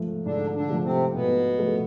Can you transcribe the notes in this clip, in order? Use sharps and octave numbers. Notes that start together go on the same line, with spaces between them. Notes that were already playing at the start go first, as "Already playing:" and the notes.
Already playing: G#2 F3 A3
G#2 D3 D4
D3 D4
F3 A3
C3 C4
G#2 B2 B3
F3 A3